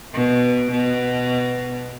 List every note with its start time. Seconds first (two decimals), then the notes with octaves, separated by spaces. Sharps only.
0.14 B2
0.71 B2